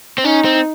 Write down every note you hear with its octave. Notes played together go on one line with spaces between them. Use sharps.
C4
C#4 D#4
C4